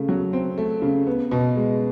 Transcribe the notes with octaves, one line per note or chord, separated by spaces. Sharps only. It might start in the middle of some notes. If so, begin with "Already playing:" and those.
Already playing: C#3 A3
F#3
C4
A3
C#3
B3
B2
G#3